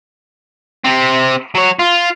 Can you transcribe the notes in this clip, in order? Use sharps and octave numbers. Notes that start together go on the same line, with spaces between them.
C3 C4
F#3 C#5
F4